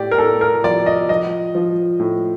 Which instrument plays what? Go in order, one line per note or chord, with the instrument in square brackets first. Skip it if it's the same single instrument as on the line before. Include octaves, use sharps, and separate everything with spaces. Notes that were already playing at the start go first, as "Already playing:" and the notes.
Already playing: [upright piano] A2 G4 D5
A#4
A2 A4
A#4
F3 D5
D#5
F3 D#5
F3
A2